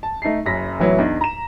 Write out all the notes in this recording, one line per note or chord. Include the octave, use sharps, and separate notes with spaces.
A5
A3 D#4 A5 C7
F#1 F#2 A#6 B6
A2 E3 F#3 B3 E4
E2 D4 D#4
A#5 E7